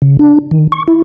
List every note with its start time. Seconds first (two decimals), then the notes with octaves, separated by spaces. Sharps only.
0.02 C#3
0.19 D4
0.51 D#3
0.72 C#6
0.88 E4